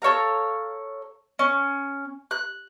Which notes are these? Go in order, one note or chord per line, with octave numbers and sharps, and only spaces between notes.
A4 C#5 F5 A#5
C#4
F#6